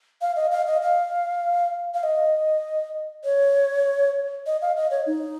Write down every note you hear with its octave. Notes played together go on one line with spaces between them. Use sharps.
F5
D#5
F5
D#5
F5
F5
D#5
C#5
D#5
F5
D#5
C#5
D#4